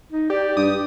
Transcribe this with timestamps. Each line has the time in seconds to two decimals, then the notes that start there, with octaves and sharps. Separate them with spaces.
0.12 D#4
0.30 G4 D5
0.57 G2 D#6